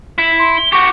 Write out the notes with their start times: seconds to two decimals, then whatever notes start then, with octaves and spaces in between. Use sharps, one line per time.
0.18 E4
0.39 C6
0.57 G7
0.73 F#4 G4 C#6